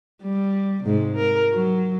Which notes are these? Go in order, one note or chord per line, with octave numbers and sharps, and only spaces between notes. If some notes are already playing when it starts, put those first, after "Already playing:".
G3
G#2 C3
A#4
F#3